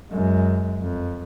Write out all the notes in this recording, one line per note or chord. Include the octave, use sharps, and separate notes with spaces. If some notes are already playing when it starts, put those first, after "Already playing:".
F#2 G#3
F2